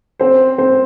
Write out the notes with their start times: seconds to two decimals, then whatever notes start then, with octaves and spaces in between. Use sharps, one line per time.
0.20 C4 C5
0.58 C4 C5